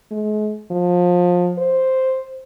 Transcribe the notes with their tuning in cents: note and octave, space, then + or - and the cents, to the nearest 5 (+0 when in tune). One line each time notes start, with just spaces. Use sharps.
G#3 +40
F3 +25
C5 +0